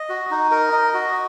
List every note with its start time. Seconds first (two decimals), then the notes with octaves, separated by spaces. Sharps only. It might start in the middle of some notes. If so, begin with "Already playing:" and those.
Already playing: D#5
0.09 F#4
0.31 D#4
0.51 A#4
0.73 D#5
0.94 F#4